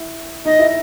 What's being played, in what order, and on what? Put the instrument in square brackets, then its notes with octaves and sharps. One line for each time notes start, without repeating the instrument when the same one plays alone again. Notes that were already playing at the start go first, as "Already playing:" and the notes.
Already playing: [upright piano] E4
[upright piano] D#4 [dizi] D#5
[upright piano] E4